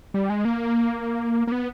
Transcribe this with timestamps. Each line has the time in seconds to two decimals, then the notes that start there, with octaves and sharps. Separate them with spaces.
0.14 G3
0.30 G#3
0.45 A#3
1.47 A#3
1.52 B3